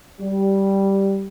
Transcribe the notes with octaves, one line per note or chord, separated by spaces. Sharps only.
G3